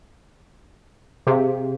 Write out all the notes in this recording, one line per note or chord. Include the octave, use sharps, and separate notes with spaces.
C3 G#4 F5